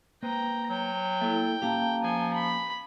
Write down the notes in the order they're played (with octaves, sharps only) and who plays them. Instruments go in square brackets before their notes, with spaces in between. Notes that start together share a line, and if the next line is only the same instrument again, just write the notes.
[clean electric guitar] A#3 B4 C5 [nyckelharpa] G5 A#5
[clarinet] F#3 [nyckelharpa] G5
[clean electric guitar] A#3 E5 [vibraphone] E4 A4
[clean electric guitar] A#3 C#4 G4 [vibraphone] F5 A5 A#5
[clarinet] F3 [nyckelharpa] G#5
[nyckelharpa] B5